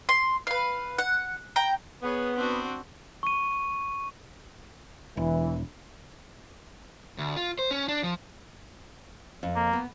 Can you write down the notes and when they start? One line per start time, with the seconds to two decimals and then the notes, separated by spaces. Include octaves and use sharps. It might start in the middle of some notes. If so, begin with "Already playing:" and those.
0.09 C6
0.47 B4 F5
0.98 F#5
1.56 G5 A#5
2.03 B3 G#4 C#5
2.35 C4 D4 F#4
3.23 C#6 D#7
5.17 E1 E3
7.18 D2
7.36 F4
7.59 C5
7.71 C#4
7.88 D4
8.03 F3
9.43 F2
9.56 A#3
9.73 B3